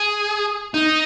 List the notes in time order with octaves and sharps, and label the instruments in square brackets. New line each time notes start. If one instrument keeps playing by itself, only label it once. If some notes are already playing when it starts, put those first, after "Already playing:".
Already playing: [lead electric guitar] G#4
D#4